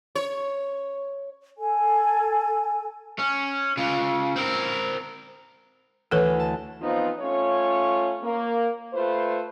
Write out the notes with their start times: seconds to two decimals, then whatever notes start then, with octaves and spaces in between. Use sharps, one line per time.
0.15 C#5
1.58 A4 G#5
3.19 C#4
3.77 C#3 F4
4.36 C4 A#4
6.11 D2 E3 A4 B4 C#5
6.40 A5
6.82 F3 B3 C4 D#4 F4
7.20 A3 C#4 F4 C#5
8.22 A#3
8.93 A3 F4 B4 C5